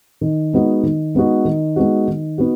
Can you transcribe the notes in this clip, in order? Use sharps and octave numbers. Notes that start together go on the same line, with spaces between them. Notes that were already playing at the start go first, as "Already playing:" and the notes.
D#3
G#3 B3 D#4 F#4
D#3
G#3 B3 D#4 F#4
D#3
G#3 B3 D#4 F#4
D#3
B3 D#4 F#4